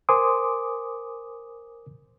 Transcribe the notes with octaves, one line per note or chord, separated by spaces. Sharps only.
A#4 C5 G#5 C6 D6 D#6